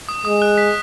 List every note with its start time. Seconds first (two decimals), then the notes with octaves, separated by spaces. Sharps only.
0.09 D#6
0.25 G#3 D#6
0.42 F#6
0.58 B6